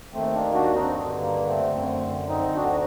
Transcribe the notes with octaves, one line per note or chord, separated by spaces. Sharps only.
D#2 D#3 A3 C4
A#3 D4
D4 F#4
C4 D#4
G2 D3
A#3
A3 C4
F#2 D3 A3 C4
C4 D#4
D2 D3 D4 F#4